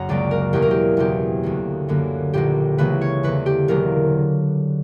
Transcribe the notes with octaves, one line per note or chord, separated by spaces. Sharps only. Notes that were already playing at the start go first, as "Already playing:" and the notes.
Already playing: F#1 F#2 F#5 A#5
C#2 C#3 F#3 A#3 D5
A#4
E2 B2 F#3 A#3 G4
A#4
G4
F#1 E2 B2 G4
D2 D3 A#3
F#2 D3 A#3
A#1 A#2 A#3 G4
C#2 C#3 E3 A#3 B4
C#5
E2 D3 A#3 B4
G4
E1 E2 D3 F#3 A#3 A#4